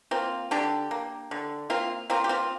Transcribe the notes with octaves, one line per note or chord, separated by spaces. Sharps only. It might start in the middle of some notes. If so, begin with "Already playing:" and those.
A#3 C4 F4
D3 D4 G4
A#3
D3
A#3 C4 F4
A#3 C4 F4
G4
C4 F4